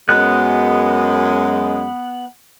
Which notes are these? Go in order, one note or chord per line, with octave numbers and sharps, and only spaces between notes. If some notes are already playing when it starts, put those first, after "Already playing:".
F#2 G#3 B3 F#6